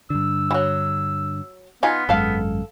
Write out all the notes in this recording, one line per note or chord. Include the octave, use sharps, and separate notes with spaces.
G2 D3 E6
E3 F#3
B3 D#4 F4 G#5
G#1 F#2 G#3 A4 F5